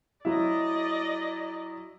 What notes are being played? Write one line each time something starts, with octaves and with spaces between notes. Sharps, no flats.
F#3 E4 D5 D#5